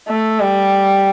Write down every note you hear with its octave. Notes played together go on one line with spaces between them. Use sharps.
A3
G3